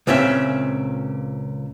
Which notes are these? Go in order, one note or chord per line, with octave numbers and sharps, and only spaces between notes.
C#2 A#2 C4 C#4 E4 E5